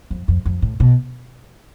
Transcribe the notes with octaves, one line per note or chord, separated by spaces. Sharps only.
F2
F2
F2
A2
B2